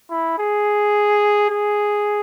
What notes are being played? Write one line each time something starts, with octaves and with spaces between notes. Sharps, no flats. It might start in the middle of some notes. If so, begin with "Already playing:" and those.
E4
G#4
G#4